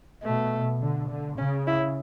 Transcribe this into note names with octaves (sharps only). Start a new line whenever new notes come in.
B2 A3
D3
D3
C#3 C#4
E4